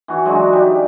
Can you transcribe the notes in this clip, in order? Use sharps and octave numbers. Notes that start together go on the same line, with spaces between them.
E3 F#4
F#3 G#3 D4 D#4
G3 G4